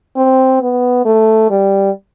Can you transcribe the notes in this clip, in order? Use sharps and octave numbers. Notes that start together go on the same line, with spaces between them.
C4
B3
A3
G3